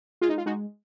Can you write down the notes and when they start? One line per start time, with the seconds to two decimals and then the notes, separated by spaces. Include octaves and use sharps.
0.21 G#3 F4
0.29 D#4
0.38 F4
0.46 G#3 D#4 F#4